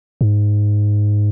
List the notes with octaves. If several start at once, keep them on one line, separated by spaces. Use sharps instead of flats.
G#2